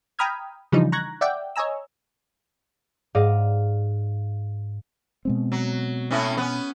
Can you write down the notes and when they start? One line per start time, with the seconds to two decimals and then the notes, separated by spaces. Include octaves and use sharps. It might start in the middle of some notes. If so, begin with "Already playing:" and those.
0.19 G5 A#5 B5 D#6 F6 G#6
0.72 C#3 E3 F3 G3 D4 D#4
0.92 A#5 C#6 F#6 G#6 A#6
1.21 D5 E5 F#5 G5 D6
1.56 C#5 D#5 G#5 A#5 E6
3.15 G#2 D5 D#5 F5
5.25 B2 G#3 C4
5.52 F#3
6.11 A2 C#4 E4
6.37 B3 C#4